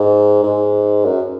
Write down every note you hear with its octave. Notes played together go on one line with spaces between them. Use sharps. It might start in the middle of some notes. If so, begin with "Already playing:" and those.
Already playing: G#2
G#2
F#2